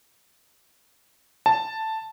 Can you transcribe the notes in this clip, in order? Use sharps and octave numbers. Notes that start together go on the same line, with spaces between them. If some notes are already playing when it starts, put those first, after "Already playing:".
A5